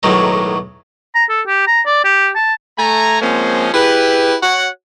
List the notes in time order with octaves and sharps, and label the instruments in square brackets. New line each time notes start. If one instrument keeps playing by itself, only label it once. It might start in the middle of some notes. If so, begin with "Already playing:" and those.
[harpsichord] B1 A2 D#3 F#3 G#3
[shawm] A#5
A4
G4
A#5
D5
G4
A5
[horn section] A3 G#5 A#5
F3 G#3 A#3 C4 C#4
E4 G4 G#4 B4
F#4 C#5 F#5